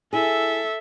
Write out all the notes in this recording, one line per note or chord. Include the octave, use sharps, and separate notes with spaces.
E4 G#4 A4 E5